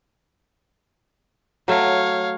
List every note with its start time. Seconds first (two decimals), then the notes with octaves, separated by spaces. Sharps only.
1.68 F#3 A3 C#5 F5